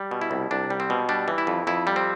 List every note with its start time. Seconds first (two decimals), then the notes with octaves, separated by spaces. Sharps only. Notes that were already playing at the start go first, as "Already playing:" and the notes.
Already playing: G3
0.11 B2
0.21 E4
0.31 C2
0.51 C2 D4
0.70 G3
0.80 C4
0.90 B2
1.09 G3 D4
1.28 E3
1.38 E4
1.47 F2
1.67 F2 E4
1.87 G3
1.96 C4